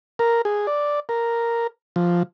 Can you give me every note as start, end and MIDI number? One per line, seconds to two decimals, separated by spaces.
0.19 0.42 70
0.45 0.67 68
0.67 1.00 74
1.09 1.67 70
1.96 2.23 53